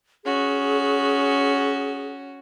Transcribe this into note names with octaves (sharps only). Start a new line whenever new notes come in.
C#4 F#4 G#4